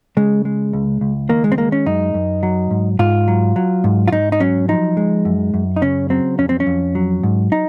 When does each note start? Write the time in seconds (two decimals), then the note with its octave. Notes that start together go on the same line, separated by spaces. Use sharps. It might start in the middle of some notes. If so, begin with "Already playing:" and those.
0.17 C#3 G#3
0.45 G#3
0.73 C#2
1.01 C#2
1.29 D#3 A#3
1.44 G#3
1.52 C4
1.58 G#3 A#3
1.72 C#4
1.86 F#2 D#4
2.14 F#2
2.43 F#3
2.71 G#2
2.99 G#2 F4
3.28 F#3
3.56 F#3
3.84 G#2
4.08 F4
4.12 G#2 D#4
4.32 D#4
4.40 F#3 C#4
4.69 F3 D#4
4.97 G#3
5.25 F#2
5.54 F#2
5.76 D#4
5.82 C#3 C#4
6.10 F#3 C4
6.38 F2 C#4
6.49 C4
6.60 C#4
6.67 F2
6.95 F#3
7.23 G#2
7.52 D#4